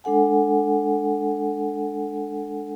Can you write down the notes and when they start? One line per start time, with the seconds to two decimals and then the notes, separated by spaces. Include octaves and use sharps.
0.04 G#3 D4 A4 F#5 G#5